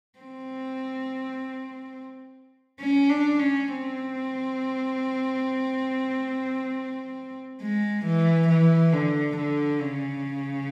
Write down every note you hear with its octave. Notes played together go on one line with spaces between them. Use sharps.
C4
C#4
D4
C#4
C4
G#3
E3
E3
D3
D3
C#3